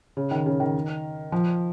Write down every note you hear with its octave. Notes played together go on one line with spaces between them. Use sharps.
C#3
D#3
C#3
D#3
F3